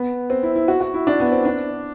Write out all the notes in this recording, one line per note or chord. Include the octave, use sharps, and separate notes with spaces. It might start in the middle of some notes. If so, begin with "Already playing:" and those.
Already playing: B3
C4
E4
E4
F#4
F#4
E4
D4
B3
C4
D4